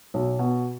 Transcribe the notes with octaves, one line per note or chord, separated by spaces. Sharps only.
B1
B2